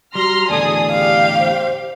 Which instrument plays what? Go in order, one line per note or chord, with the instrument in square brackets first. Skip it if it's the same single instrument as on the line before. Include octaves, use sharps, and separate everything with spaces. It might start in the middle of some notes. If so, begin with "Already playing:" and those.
[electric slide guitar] G3 [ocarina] F#4 [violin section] A#5 C6 F6
[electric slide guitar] E2 A2 D3 [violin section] G#4 A4 D#6 [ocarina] D5
[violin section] G4 [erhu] F5
[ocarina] C5